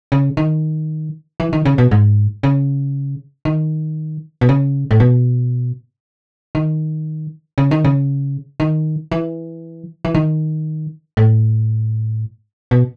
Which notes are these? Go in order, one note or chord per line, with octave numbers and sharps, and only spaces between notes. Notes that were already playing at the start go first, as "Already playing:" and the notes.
C#3
D#3
E3
D#3
C#3
B2
G#2
C#3
D#3
B2
C#3
A2
B2
D#3
C#3
D#3
C#3
D#3
E3
E3
D#3
A2
B2